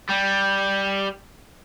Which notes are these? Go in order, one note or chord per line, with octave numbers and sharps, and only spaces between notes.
G3